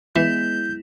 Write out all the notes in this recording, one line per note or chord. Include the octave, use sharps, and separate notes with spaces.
E3 G#3 B3 E4 G6